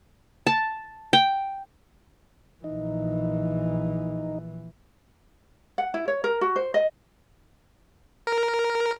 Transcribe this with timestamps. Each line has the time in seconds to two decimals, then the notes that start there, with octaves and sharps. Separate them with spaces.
0.47 A5
1.13 G5
2.64 A#1 E3 D#4
5.78 F#5
5.94 E4
6.08 C#5
6.24 A#4
6.41 F#4
6.56 C5
6.74 D#5
8.27 A#4